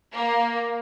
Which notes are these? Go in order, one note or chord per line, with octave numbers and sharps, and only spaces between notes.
A#3